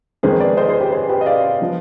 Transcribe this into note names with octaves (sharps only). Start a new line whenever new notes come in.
F2 D#3 G#3 B3 G#4 C5
B4 D5
C5 D#5
G#4 C5
G4 B4
G#4 C5
G4 B4
D#5
D5 F5
F3 B3